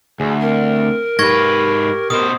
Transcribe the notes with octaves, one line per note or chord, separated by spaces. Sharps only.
D2 G#4
C4 A#4
G#2 G4 B4 C#6 G#6 A#6
B2 A#4 C5 D#6